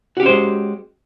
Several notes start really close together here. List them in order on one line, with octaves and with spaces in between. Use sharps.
F#4 G4 C#4 C5 G#3